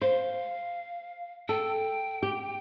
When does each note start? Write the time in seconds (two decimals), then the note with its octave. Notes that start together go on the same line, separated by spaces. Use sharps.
0.01 C5 F5
1.48 A4 G5
2.23 G4